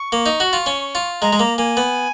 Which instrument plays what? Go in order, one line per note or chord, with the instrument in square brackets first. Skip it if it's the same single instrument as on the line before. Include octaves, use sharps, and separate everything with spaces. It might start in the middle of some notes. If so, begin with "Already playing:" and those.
Already playing: [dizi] C#6
[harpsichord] A#3
D#4
F#4
F4
C#4
F4
[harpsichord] G#3 [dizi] A#5
[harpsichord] G#3
[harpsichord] A#3 [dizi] A#5
[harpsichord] A#3 [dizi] G#5
[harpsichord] B3